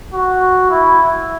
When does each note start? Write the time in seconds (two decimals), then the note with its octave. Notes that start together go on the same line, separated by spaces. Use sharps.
0.13 F#4
0.70 E4